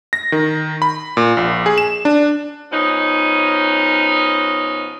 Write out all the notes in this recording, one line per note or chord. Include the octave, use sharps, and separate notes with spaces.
A#6
D#3
B5
A#2
A#1
G#4
E7
D4
B2 F3 C#4 D#4